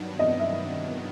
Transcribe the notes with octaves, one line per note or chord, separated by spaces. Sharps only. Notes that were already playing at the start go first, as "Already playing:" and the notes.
Already playing: G2 D#3 F#3 B3 D4
D#5
E5